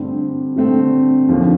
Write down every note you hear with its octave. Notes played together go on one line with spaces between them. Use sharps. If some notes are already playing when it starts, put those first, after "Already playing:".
Already playing: G2 D3 A3 C4
G2 D3 A3 C4
D#2 D3 F3